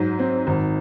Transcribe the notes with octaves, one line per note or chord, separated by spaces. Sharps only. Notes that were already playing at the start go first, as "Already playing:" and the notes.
Already playing: G#2 F#3
C4
G#1